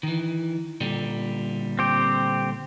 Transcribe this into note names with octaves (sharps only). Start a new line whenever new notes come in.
D#3 E3
A#2 D3 G3
C4 G4